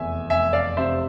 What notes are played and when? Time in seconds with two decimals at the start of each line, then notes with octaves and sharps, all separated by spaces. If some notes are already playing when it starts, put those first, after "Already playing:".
Already playing: F1 E2 E5 G#5
0.30 F1 E5 G#5
0.53 D5 F5
0.77 C3 C5 E5